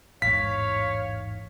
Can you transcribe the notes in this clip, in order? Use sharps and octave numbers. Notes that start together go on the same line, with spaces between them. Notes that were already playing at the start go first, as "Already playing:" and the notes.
A1 E2 G#2 C#5 F5 B6